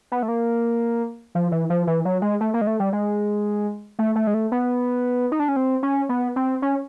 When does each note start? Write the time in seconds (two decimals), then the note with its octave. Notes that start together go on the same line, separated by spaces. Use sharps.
0.12 B3
0.23 A3
0.28 A#3
1.35 F3
1.52 E3
1.70 F3
1.87 E3
2.05 F#3
2.22 G#3
2.41 A3
2.54 A#3
2.61 G#3
2.67 A3
2.80 G3
2.93 G#3
3.99 A3
4.16 A3
4.27 G#3
4.34 A3
4.52 B3
5.32 D#4
5.40 D4
5.49 C#4
5.56 C4
5.83 C#4
6.09 B3
6.36 C4
6.62 C#4